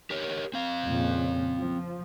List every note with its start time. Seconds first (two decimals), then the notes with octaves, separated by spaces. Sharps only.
0.10 G4 A#4 C#5
0.53 C4 F5
0.86 F2 A#2 C#3
1.62 F3